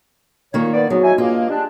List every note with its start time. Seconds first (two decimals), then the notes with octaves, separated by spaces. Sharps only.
0.54 A#2 D#3 A#3 C#5
0.73 B3 D5
0.90 G#2 F#3 B3
1.03 D#4 E4 G#5
1.18 G2 G#3 A#3 F4
1.50 G3 G#3 D4